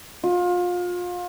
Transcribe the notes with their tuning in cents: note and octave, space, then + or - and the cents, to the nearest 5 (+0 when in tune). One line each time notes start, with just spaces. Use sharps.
F4 +30